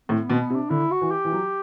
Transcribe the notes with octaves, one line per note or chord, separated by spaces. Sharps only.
A2 C4
B3
B2
C4
B3
C3
D4
D3 E4
F#4
E3
G4
E3
F#3